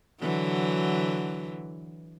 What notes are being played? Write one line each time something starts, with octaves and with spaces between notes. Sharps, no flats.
D3 E3 F#3